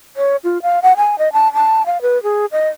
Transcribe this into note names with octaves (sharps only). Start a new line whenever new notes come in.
C#5
F4
F5
F#5
G#5
D#5
A5
A5
F5
B4
G#4
D#5